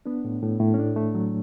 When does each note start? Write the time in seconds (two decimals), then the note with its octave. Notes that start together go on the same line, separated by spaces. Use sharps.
0.06 B3 D4
0.24 A2
0.43 A2
0.60 A2
0.74 C#4
0.78 A3 D4
0.96 A3
1.15 F#3